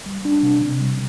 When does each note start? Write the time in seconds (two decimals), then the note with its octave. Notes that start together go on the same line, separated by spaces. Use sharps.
0.06 G3
0.25 D4
0.43 C3
0.62 C3
0.81 G3